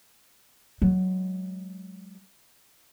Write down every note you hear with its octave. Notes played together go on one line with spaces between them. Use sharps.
F#3 G#3